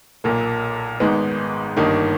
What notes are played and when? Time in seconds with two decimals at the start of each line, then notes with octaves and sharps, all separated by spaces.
0.24 B1 A#2 A#3
1.00 G#1 G#2 D#3 G#3 B3
1.77 G1 G2 D#3 A#3 D#4